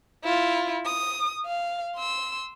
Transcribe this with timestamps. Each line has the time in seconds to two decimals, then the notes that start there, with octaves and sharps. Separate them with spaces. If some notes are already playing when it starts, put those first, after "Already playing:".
0.24 E4 F4
0.86 D#6
1.45 F5
1.96 C6 E6